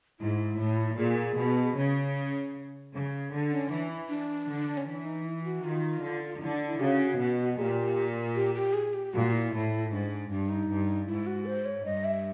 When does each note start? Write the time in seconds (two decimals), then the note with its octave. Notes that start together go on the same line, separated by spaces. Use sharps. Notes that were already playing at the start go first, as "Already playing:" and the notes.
0.20 G#2 E4
0.59 A2
0.97 A#2 G#4
1.36 B2
1.76 C#3
2.92 C#3
3.31 D3
3.50 C#4
3.69 E3 D4
4.09 D4
4.47 D3
4.77 C#4
4.86 E3 D4
5.05 D#4
5.25 E4
5.44 F#4
5.64 D#3 F4
6.02 D3
6.41 D3 E4
6.55 D4
6.67 E4
6.80 C#3 F#4 G4
7.19 B2
7.57 A#2 G4 G#4
8.35 G4
8.55 G4
8.74 G#4
8.93 G4
9.13 A#2 F#4
9.32 E4
9.52 A2
9.91 G#2 D4
10.29 G2 D4
10.49 D#4
10.68 G2
11.07 G#2 E4
11.27 F#4
11.45 C5
11.65 C#5
11.84 G2 D#5
12.05 E5